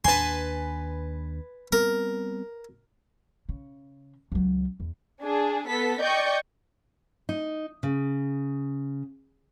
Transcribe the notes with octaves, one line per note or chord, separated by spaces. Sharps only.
D#2 D4 B4 G#5 A5 C6
G3 B3 C4 A#4
C#3
C#2 F#3
E2
D4 G#4
B3 A4 B6
D5 D#5 G5 C#6 G6
D#4
C#3